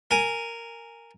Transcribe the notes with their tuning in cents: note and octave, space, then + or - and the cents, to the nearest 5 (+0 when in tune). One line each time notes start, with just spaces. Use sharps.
A#4 -10 G#5 +0